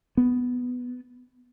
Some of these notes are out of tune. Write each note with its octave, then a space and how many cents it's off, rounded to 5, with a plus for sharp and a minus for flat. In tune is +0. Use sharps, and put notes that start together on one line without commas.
B3 +5